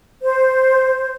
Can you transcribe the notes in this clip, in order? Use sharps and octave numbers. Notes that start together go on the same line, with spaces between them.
C5